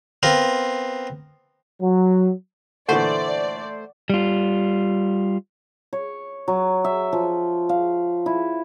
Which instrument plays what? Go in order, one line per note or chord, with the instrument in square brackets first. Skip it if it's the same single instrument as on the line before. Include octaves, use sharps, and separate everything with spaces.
[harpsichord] B3 C4 F4 A#4
[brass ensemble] F#3
[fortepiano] A#2 D3 E3 [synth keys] A3 C5 [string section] D5 [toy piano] F#5 C#6
[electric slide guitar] G3 F4
[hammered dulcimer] C#5
F#3
E5
F3
F5
E4